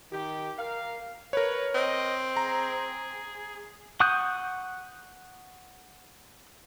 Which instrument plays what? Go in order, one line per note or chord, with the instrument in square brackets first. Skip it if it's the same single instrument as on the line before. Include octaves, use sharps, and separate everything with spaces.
[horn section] D#3 G4
A#4 F5
[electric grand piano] A#4 C#5 [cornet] B4
[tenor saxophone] C4 [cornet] D#5
[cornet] G#4 [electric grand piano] A#5
[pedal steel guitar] F#5 C#6 D#6 F#6 G6